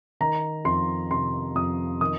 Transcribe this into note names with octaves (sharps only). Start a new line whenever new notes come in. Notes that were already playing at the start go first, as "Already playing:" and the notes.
D#3 A#5
F2 C6
C3 C6
F2 D#6
D#3 D#6